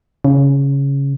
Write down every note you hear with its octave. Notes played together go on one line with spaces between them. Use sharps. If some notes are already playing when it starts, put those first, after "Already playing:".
C#3